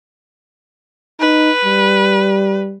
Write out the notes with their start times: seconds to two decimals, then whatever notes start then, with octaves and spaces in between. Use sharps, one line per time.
1.20 D#4 B4
1.65 G3